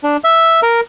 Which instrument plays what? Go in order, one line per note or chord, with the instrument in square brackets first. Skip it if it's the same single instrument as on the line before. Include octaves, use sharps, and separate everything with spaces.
[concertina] D4
E5
A#4